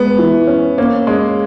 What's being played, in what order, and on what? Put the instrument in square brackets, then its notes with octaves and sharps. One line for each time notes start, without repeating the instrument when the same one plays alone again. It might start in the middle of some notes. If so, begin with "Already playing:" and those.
Already playing: [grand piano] G#3 [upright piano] B3
[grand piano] E3
C#4
[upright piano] A#3 [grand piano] C#4
[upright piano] G#3 [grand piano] C#4